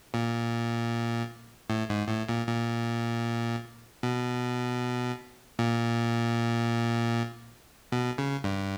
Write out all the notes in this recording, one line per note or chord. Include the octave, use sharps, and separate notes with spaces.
A#2
A2
G#2
A2
A#2
A#2
B2
A#2
B2
C#3
G2